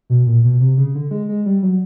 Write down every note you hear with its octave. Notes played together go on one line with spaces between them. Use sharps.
B2
A#2
B2
C3
C#3
D3
G#3
G#3
G3
F#3